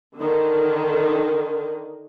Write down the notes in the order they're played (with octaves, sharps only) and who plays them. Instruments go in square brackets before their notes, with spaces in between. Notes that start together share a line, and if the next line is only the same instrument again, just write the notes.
[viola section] D3 D#3